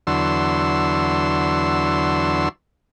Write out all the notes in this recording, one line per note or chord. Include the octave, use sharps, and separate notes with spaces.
E2 D3 F#3 C6 E6